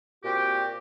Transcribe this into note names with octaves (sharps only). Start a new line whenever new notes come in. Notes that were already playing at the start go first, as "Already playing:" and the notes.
A#2 C4 F#4 G4